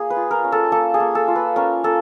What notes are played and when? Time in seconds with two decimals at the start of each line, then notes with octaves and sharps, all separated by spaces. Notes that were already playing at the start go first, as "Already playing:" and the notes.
Already playing: A#3 G#4
0.10 B4
0.16 F4
0.31 A#4
0.44 C#4
0.52 A4
0.72 A#3 A4
0.94 G#4
1.00 A#3
1.15 A4
1.28 F4
1.36 B4
1.56 C#4 A#4
1.84 A#3 A4